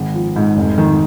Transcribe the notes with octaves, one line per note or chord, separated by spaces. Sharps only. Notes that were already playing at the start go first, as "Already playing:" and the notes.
Already playing: G#1
F3
G#2
F1
D#3